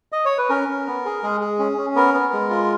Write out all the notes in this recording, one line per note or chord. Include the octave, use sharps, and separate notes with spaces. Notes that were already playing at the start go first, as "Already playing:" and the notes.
D#5
C#5
B4
C#4 A#4
C#4
B3
G#4
G#3 G#4
G#4
C#4
C#4
B3 A#4
B3
G#3
F4